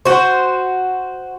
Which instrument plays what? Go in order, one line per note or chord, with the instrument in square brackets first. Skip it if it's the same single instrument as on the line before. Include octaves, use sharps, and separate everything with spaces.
[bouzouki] F#4 C5